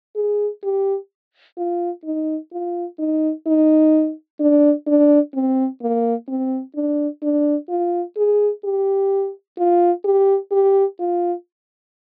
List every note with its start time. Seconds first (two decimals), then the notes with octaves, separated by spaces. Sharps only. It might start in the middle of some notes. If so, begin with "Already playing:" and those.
0.16 G#4
0.63 G4
1.57 F4
2.04 D#4
2.52 F4
2.99 D#4
3.46 D#4
4.40 D4
4.86 D4
5.34 C4
5.81 A#3
6.28 C4
6.75 D4
7.22 D4
7.69 F4
8.17 G#4
8.64 G4
9.58 F4
10.04 G4
10.51 G4
11.00 F4